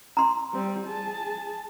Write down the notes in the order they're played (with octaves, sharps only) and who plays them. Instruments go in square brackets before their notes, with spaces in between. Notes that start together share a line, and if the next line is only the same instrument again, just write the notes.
[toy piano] A#5 C6
[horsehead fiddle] G3 C4
G#4 A5